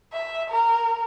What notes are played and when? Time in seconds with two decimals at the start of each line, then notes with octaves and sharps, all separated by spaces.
0.13 E5
0.50 A#4